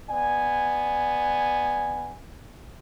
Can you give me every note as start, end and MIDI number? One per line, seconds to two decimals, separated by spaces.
0.10 2.17 59
0.10 2.17 74
0.10 2.17 80